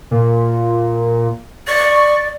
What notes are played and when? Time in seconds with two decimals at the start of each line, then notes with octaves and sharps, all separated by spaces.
0.11 A#2
1.68 D5 C#6